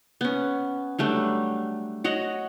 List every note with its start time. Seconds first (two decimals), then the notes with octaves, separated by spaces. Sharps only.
0.21 B3 C#4
0.99 F#3 G3 A3 D4
2.04 F#4 C#5 D#5 F#5